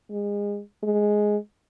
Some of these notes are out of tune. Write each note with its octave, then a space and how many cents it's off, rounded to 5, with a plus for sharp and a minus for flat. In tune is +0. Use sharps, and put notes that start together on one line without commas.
G#3 -30
G#3 +5